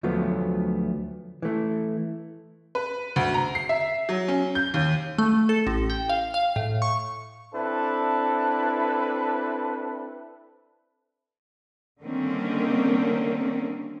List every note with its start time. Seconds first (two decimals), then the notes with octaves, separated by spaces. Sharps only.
0.03 D2 F3 F#3 A3 B3
1.42 E3 A3
2.75 B4
3.16 D2
3.34 A#5
3.55 C7
3.69 E5
4.09 F#3
4.28 C#4
4.55 G6
4.74 D#2
5.18 A3
5.49 A4
5.67 A1
5.90 G5
6.09 F5
6.34 F5
6.56 A2
6.82 C#6
7.54 C4 D4 E4 A4 B4
12.02 D3 D#3 G3 A#3 C4 C#4